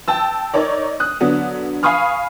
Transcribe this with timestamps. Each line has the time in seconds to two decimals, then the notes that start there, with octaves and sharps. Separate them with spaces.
0.08 G5 A5 E6
0.54 D#4 A#4 C#5 D5
1.00 D#6 F#6
1.21 D3 F#3 B3 D4
1.83 F5 G#5 B5 C#6 D#6 F6